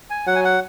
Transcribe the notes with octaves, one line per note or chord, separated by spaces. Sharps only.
G#5
F#3 F#5
G#5
F#5